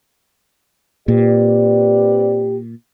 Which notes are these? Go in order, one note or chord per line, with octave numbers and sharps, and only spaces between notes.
A#2 C4 G4 B4 D5